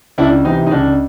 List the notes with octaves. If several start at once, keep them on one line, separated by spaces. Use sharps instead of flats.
C#2 D4 E4
C3 E3 D#4
D#4
C#2 D4